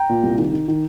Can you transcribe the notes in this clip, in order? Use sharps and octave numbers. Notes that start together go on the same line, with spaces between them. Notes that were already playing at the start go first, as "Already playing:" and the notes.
Already playing: G5 A#5
A#2
C2
D#3
D#3
D#3